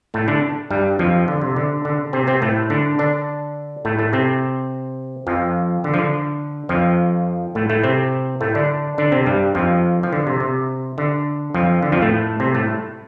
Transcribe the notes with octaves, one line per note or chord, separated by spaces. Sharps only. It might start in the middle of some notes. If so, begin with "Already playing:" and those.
A2 A3
D3 D4
G2 G3
F2 F3
D3
C3
D3
D3
C3 C4
C3 C4
A2 A3
D3 D4
D3 D4
A2 A3
A2 A3
C3 C4
F2 F3
D3
F3
D3
F2 F3
A2 A3
A2 A3
C3 C4
A2 A3
D3 D4
D3 D4
C3 C4
G2 G3
F2 F3
F3
D3
C3
C3
D3
F2 F3
D3
F2 F3
A2 A3
C3 C4
A2 A3